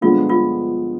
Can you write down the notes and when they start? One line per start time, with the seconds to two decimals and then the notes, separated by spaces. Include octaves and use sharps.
0.01 G2 D3 F3 G#3 B3 F4
0.29 F4